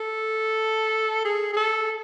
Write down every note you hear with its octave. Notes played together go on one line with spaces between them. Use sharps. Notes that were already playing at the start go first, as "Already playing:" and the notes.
Already playing: A4
G#4
G#4
A4